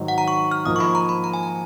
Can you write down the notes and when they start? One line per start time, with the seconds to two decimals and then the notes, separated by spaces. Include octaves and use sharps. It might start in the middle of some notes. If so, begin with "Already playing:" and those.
Already playing: G#2 D#3 F#3
0.08 F#5
0.18 A#5
0.28 C#6
0.51 F6
0.65 G#2 F3 A#3 D#4 D#6
0.76 C#6
0.80 B5
0.95 A#5
1.09 B5
1.24 A#5
1.34 G#5
1.43 A#5